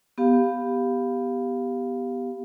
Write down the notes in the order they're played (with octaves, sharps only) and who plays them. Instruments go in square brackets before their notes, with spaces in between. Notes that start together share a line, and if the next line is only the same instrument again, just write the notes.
[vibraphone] B3 G4 F5